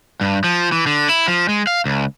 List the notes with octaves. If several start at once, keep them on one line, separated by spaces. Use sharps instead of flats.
G2
F3
E3
D3
E4
F3
G#3
F5
C#2